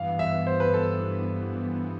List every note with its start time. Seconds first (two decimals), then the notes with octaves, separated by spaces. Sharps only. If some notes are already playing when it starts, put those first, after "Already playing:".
Already playing: G2 E3 B3 F5
0.19 E5
0.47 C5
0.60 B4
0.74 A4